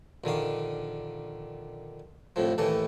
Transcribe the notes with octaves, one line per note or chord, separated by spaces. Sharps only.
A#1 D3 D#3 F5
C2 F2 A2 F3
D#2 A2 E3 A4